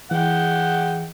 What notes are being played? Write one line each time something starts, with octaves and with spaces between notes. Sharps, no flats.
E3 G#3 F#5 G5